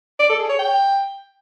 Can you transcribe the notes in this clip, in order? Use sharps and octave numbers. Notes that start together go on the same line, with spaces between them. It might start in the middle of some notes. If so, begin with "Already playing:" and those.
D5
A4
G#4
C#5
G5